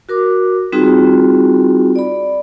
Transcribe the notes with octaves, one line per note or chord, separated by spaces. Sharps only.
F#4 A#4 D6
G3 C4 D#4 F4 F#4 G#4
D5 B5